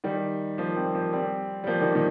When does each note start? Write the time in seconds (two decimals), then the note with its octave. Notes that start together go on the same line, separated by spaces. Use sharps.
0.04 D#3 G3
0.58 F3 A#3
0.76 G3 C4
0.95 F3 A#3
1.13 G3 C4
1.64 G3
1.67 F3 A#3
1.81 D#3 G3
1.95 A#2 D#3